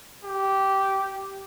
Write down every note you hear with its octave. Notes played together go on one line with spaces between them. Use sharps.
G4